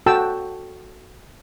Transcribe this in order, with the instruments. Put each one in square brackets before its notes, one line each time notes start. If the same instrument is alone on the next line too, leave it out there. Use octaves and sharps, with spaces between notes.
[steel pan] F#4 A4 G5 A5 E6